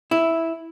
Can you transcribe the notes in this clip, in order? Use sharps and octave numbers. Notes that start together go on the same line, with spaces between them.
E4